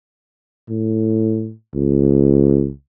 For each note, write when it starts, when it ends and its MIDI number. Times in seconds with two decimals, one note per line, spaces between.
0.70 1.52 45
1.74 2.70 37